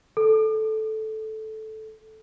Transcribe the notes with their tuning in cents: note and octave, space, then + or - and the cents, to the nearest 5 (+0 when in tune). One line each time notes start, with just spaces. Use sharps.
A4 -10